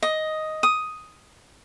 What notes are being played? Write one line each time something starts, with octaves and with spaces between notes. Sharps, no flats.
D#5
D#6